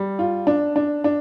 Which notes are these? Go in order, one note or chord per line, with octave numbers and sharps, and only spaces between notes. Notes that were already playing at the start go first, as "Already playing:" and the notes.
Already playing: G3
F4
D4
D4
D4